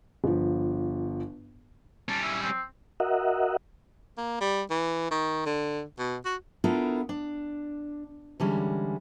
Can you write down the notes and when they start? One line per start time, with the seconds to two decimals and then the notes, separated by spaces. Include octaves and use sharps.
0.24 G1 F3
2.09 G3 C#4 A5
2.23 E4
2.43 C4
3.00 F#4 A#4 D#5 E5 F#5
4.18 A#3
4.41 G3
4.71 E3
5.11 D#3
5.46 D3
5.99 B2
6.25 F#4
6.64 B3 D4 E4 F4 A4 A#4
7.09 D4
8.40 D3 E3 G3 G#3 C#4